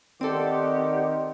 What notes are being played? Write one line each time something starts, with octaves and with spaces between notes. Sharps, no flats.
D#3 C4 G4 A4 D5 F#5 C6 D6